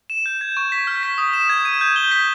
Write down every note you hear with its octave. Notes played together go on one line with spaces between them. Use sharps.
E7
G6
G#6
C#6
B6
F6
B6
D#6
E7
G#6
D#7
G6
G7
B6